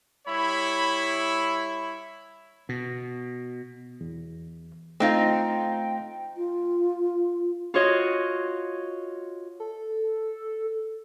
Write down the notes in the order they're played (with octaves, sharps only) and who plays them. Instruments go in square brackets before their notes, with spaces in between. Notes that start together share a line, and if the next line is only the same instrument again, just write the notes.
[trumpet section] G3 E4 C#5 B5
[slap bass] B2
[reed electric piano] E2
[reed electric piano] A3 [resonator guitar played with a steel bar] C4 D#4 F4 [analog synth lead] G5
[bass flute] F4
[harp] F4 F#4 C#5 D#5
[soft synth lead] A4